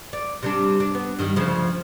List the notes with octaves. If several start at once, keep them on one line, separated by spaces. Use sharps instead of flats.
D5
C3 G3 D4
D4
B3
G2 D#3 G3
D2 C#3 F3